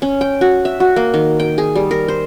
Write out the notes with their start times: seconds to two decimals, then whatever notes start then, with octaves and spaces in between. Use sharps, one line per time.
0.02 C#4
0.21 G5
0.41 F#4
0.65 E5
0.80 F#4
0.96 A#3
1.14 D#3
1.40 G5
1.58 G#4
1.75 G3
1.91 A#4
2.08 C5